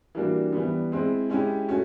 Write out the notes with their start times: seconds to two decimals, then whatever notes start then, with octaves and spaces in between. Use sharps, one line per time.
0.15 E3 G3 A#3 D4 F#4
0.53 E3 G3 B3
0.92 G#3 C4 E4
1.30 G#3 C#4 E4 G4
1.68 A3 C#4 F#4